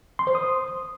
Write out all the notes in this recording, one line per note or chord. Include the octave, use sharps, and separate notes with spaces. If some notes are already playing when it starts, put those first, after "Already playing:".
C6
C5
D#6